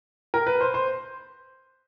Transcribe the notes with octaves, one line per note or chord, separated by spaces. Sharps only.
A#4
B4
C5
C5